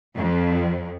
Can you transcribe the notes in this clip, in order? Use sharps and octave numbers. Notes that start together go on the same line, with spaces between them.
F2